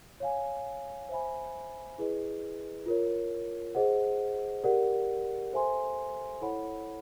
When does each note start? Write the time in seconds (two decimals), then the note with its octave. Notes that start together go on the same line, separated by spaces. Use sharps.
0.20 C#5 F5 G#5
1.09 C5 E5 G#5 B5
1.98 E4 G#4 B4 D#5
2.86 F4 A#4 C#5
3.75 G#4 C5 D#5 F#5
4.64 G4 A#4 D5 F#5
5.53 A4 C5 E5 G#5 C6
6.41 E4 A4 C#5 F#5 B5